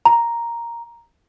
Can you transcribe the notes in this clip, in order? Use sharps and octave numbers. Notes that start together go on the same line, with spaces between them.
A#5